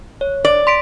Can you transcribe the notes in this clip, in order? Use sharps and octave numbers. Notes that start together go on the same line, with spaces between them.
C#5
D5
C6 B6 D7